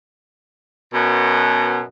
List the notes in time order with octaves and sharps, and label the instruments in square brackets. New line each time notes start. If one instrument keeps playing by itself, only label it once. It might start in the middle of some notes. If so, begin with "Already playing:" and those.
[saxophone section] F#2 B2